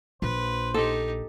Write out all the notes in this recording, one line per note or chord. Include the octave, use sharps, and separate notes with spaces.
A#1 B4 C5
D#4 G4 A4